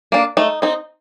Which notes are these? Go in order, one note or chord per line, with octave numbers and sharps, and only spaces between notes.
A#3 D4
A3 D#4
C4 D#4